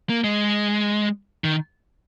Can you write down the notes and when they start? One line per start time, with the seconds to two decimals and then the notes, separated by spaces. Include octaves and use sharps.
0.09 A#3
0.24 G#3
1.44 D#3